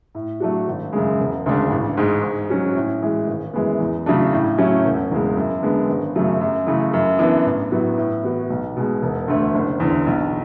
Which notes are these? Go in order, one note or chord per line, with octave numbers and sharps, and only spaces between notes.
A2
F#3 A3 D4 F#4
G#1
F#2 C#3 G#3
E1
D2 C#3 G#3 D4
A1
G#2 G#3
G#2
F#3 C#4 F#4
A2
E3 G#3
G#1
F#2 E3 G#3 B3
E2
C#3 F#3 A3 D4
A2
F#3 A3 C#4 E4
E1
E2 C#3 G#3
F#2
D3 G#3 B3 D4
G#1
F#2 C#3 F#3 A3
F#2
C#3 E3 A3
F#2
E3 B3 D4
A1
A2 F#3 B3
A2
E3 B3 F#4
B1
B2 G#3
E1
D2 D3 A3
F#1
E2 D3
B1